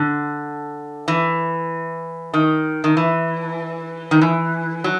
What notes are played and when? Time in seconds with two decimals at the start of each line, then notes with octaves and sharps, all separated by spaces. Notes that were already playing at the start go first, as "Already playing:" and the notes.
Already playing: D3
1.08 E3
2.34 D#3
2.84 D#3
2.97 E3
4.11 D#3
4.21 E3
4.84 F#3